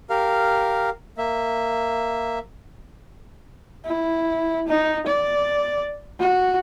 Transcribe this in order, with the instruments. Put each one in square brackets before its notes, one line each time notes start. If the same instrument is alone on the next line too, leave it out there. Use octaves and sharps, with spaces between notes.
[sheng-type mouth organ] G4 A#4 F5
A#3 E5
[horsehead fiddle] E4
D#4
D5
F#4